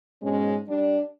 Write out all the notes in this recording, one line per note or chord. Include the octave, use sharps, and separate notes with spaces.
G#2 B2 G#3 C#4
G3 D4